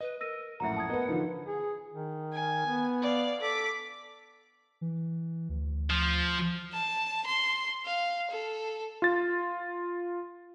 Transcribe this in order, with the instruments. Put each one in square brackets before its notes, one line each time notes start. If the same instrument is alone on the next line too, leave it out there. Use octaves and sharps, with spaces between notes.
[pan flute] B4 [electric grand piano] D#5
[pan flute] A#4 [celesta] E6 A#6 D#7
[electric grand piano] A#1 F#2 A2 [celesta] E5 A#5 [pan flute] F#5
[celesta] A5 D#6 G#6
[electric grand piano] B3 D#5 [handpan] A#4 B4
[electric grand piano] D3 E3 F3 [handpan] D#4 F4
[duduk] G#4
D#3
[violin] G#5
[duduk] B3
[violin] D5 F5
[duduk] A4 [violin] D6 B6
[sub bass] E3
D2
[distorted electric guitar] F3
[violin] A5
C6
F5
A4
[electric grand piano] F4 A6